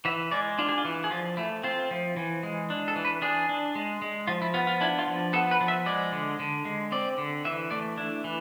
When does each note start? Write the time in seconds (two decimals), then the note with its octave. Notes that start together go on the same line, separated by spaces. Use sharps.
0.05 E3 E5
0.31 G#3 D5
0.59 D4 F4
0.69 G#4
0.78 F4
0.85 E3
1.04 G#4
1.11 F3 F4
1.37 A3 E4
1.63 C4 F4
1.91 F3
2.17 E3
2.43 G#3
2.70 D4
2.88 A4
2.96 E3
3.05 B4
3.22 D4 G#4
3.49 D4
3.75 G#3
4.02 G#3
4.27 F3 F4
4.42 E4
4.54 B3 F4
4.67 F4
4.81 D4 E4
4.99 F4
5.07 F3
5.33 B3 A4
5.51 B4
5.61 F3
5.68 E5
5.86 G#3 D5
6.12 D3
6.40 D3
6.65 G#3
6.92 C4 D5
7.18 D3
7.45 E3 E5
7.71 A3 D5
7.98 D4 E4
8.24 E3